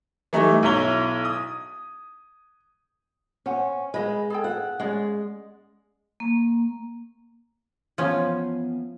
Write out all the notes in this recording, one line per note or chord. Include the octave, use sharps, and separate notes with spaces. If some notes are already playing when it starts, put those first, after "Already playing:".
E3 G3 A3 D#4
B1 E4 C#5 A#5 G7
D#6
C#4 C5 F#5
G#3 B4 D#5 B5
G#4 A4 G5
F#5
G#3 C#4 C#5 D5
A#3
E3 F3 B3 C#4 F5